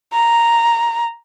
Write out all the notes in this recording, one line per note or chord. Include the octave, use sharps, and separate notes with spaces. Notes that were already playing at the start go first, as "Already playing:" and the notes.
A#5